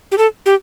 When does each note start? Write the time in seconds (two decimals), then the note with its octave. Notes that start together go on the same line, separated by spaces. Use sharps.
0.12 G4
0.18 A4
0.46 G4